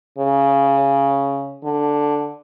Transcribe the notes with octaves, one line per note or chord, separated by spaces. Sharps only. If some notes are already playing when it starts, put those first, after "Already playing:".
C#3
D3